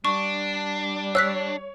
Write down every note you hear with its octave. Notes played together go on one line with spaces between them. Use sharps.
G3 D4 C#6
C#5 E6 F#6 B6